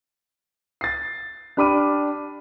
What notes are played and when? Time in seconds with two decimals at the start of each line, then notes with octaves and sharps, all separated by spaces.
0.81 A6 C7
1.57 D4 G4 B5 D6 F6 D#7